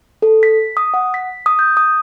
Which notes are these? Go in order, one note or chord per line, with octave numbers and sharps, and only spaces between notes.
A4
B6
D#6
F#5
B6
D#6
G6
D#6